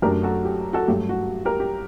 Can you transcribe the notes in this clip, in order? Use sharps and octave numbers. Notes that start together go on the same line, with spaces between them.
F#2 F#3 A3 D4 G4 A#4
F#4 A4
G4
F#4 A4
G2 F#3 A3 G4
F#4
G4 A#4
G4